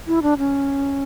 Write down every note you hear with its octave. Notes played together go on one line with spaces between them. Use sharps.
E4
D4
C#4